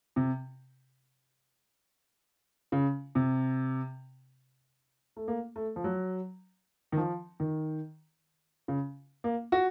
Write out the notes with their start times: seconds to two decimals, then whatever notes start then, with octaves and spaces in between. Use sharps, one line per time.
0.16 C3
2.72 C#3
3.15 C3
5.17 A3
5.28 A#3
5.56 A3
5.76 F3
5.84 F#3
6.92 D#3
6.97 F3
7.40 D#3
8.68 C#3
9.24 A#3
9.52 F#4